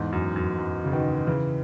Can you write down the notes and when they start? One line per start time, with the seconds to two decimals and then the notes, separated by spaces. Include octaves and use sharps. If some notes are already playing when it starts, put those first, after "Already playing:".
Already playing: E2 G#2
0.12 F#2
0.36 F#2
0.58 F#2
0.84 C#3
0.92 B2 D#3
1.27 C#3 E3